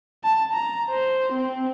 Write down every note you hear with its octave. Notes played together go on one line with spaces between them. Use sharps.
A5
A#5
C5
C4